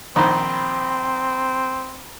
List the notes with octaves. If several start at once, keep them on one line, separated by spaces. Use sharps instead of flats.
A#1 D#3 C4 C5 A#5 B5